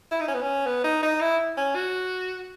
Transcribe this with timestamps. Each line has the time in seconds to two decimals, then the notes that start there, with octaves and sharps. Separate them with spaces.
0.11 E4
0.21 D#4
0.28 C#4
0.35 B3
0.42 C#4
0.66 B3
0.84 D#4
1.03 D#4
1.21 E4
1.57 C#4
1.75 F#4